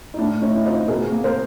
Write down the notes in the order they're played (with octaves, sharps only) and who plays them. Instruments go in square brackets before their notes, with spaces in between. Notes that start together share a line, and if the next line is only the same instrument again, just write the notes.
[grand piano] D#4
A2 D4 E4
A3 C#4 D#4
E4
C4 D#4 F4
B2 G#4 A#4
A#3
A#4 C5